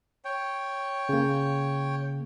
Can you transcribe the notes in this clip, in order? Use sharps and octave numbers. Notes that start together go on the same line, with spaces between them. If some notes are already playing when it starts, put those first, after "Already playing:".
C#5 G5
C#3 A#3